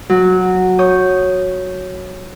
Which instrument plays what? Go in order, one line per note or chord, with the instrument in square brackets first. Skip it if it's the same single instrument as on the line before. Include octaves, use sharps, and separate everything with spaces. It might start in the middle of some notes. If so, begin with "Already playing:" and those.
[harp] F#3
C#5 D#6 G6